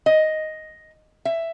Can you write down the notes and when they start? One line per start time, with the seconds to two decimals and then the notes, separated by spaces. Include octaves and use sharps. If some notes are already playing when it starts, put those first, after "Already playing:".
0.06 D#5
1.25 E5